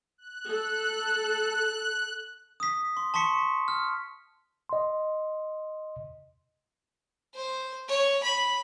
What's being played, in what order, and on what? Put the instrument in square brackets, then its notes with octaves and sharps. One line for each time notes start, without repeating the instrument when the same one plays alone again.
[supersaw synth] F#6
[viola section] A4
[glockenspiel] D#6 B6
C6
A5 C6 C#6 B6 C#7
F6
[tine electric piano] D#5 C6
[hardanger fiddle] C5
C#5
B5